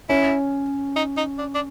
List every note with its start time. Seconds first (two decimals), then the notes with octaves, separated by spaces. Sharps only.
0.09 C#4 E4
0.96 D#4
1.17 D#4
1.38 D4
1.55 D4